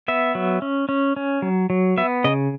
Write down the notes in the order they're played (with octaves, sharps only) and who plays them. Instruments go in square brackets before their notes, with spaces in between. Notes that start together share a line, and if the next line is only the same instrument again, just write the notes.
[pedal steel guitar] B3 E5
F#3
C#4
C#4
C#4
F#3
F#3
B3 E5
C#3 D#5